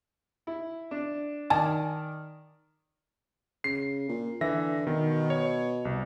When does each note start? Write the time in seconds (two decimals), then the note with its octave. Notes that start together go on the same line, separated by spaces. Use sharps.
0.47 E4
0.91 D4
1.50 D#3 D5 G#5 A5
3.64 C#3 C7
4.09 A#2
4.41 D3 E3 E5 A#6
4.87 B2 D#3
5.30 C#5
5.85 C2